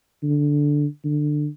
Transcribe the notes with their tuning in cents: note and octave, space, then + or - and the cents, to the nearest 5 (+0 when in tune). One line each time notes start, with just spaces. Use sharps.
D3 -5
D3 +20